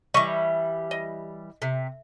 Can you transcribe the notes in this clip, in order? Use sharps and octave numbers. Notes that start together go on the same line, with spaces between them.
E3 G3 D#5 C#6
D#5
C3